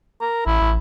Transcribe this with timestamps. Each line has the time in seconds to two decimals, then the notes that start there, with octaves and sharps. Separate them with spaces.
0.21 A#4
0.46 A1 E4
0.61 A1